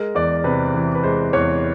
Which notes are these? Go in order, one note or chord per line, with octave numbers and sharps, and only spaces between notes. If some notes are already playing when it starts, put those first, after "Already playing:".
Already playing: G#3 A#4
E2 D5
C3 B4
E3
B4
G#3 C5
E2 C#5